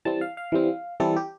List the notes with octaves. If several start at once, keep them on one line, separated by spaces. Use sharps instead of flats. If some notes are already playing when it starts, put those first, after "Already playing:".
E3 G3 C4 A5
F5
F5
E3 G3 C4
E3 G3 C4 A4
G4